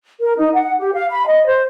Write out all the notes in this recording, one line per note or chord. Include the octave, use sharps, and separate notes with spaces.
A#4
D#4
F#5
G4
F5
B5
D#5
C5